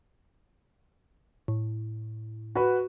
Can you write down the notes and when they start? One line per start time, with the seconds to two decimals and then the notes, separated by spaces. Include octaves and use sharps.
1.48 A2
2.55 F#4 B4